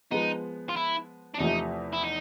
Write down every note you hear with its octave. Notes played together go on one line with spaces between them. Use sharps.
F3 G#3 B3 D#4
F4
E4
D4
E2 C3 F3 A3 D#4
E4
D#4